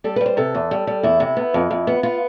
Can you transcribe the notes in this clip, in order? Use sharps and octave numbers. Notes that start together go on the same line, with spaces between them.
G3 A4
B4
G3
C5
C3 A4
E2
G3
G3
E2 E4
C3
B3
F2
F2
B3
B3 F4